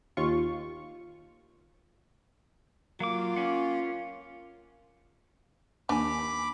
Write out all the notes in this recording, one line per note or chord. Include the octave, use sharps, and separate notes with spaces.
D#2 F4 C#6
F#3 A#3 F4 D6
C#4 F#5
D#2 D4 G#5 B5 D6